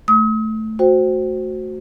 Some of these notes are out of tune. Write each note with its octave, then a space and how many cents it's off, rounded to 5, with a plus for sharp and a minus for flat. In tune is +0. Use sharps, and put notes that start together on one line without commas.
A3 +0 D#6 +40
F#4 +0 C5 +0 G5 +0